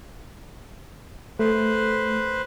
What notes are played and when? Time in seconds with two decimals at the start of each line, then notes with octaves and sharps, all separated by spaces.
1.39 A3 B4 C5